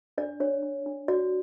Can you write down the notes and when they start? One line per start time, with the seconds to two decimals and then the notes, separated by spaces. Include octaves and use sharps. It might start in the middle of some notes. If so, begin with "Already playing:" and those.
0.18 D4 D5
0.40 D4 C#5
0.63 D4
0.86 D4
1.08 F#4 D5